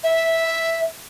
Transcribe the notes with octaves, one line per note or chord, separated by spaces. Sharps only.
E5